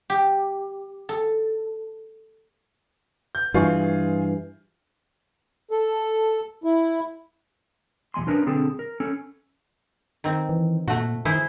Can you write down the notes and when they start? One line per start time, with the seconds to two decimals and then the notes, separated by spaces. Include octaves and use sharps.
0.10 G4
1.09 A4
3.35 G6
3.54 G2 E3 F4 G#4 C#6
5.71 A4
6.64 E4
8.14 B1 E2 G#3 G#5 C6
8.27 C#4 D4 A#4 B4
8.46 B1 D3 C4 G#4 A4
8.79 A#4
9.00 C#4 A4
10.24 D#3 C4
10.49 E3
10.88 A#2 A3 F#4
11.25 D#3 E4 G#4 C5